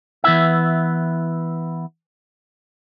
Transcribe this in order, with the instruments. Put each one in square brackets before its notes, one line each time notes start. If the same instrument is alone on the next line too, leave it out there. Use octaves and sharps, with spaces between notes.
[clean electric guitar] E3 B3 E4 E5